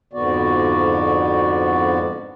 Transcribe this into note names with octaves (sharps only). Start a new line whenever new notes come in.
F2 G#2 D3 B3 F#4 D5